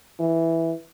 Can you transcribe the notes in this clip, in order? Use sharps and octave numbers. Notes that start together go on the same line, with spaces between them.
E3